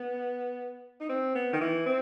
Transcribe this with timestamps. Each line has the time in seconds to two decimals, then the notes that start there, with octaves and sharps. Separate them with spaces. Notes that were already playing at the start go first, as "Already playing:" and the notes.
Already playing: B3
1.00 D#4
1.09 C4
1.35 B3
1.53 D#3
1.60 E3
1.86 C4